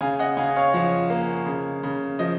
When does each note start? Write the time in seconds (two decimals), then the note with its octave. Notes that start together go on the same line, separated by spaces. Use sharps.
0.01 C#3 F5 G#5
0.19 D#5 F#5
0.37 C#3 F5 G#5
0.56 C#5 F5
0.74 F3 C#5 F5
1.10 A#3
1.46 C#3
1.83 C#3
2.19 F3 D#5